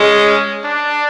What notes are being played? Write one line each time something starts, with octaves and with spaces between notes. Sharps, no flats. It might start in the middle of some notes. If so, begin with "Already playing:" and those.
Already playing: G#3 C#4
D4